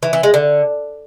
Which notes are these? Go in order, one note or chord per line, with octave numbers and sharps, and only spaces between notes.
E3
E3
G#3
D3